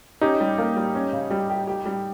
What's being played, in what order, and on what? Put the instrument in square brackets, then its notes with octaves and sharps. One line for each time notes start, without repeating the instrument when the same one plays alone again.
[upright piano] C#4 [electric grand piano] D#4 G4
[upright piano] G3
A#3
G3
C#4
C#3
G3
G4
G4
G3